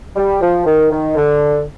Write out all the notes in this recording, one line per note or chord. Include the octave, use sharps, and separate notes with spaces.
G3
F3
D#3
D#3
D3